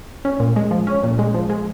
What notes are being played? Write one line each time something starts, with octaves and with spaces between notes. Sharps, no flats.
C#4
A#2
G#3
F3
C#4
A#2
G#3
F3
G#3